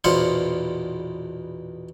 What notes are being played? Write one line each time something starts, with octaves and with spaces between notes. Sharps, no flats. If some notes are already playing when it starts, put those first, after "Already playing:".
A#1 E2 B2 C5 F5 F#5